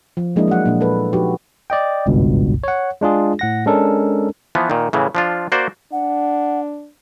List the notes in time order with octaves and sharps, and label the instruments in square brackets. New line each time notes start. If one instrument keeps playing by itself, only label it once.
[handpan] F3
F3 G#3 A#3 D4 E4 D#5
F#3 F#4 F#5
A#2 F3 D4
A4 B4
F3 D#4 F#4 G4 B4
[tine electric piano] D5 D#5 G5
G#1 C#2 G2 B2
C#5 F#5
G#3 D4 F4 G#4
A2 F#5 A#6
G#3 C#4 D4 A4 A#4
[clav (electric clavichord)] E3 F3 B3
A#2 D#3
A2 C#3 E3
F3 D4 F4
A#3 F#4 C5 D5
[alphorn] D4 [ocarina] F#5